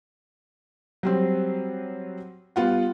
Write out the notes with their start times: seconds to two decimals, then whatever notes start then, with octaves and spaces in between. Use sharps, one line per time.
1.03 F#3 G3 C4
2.56 G3 B3 F4 F#5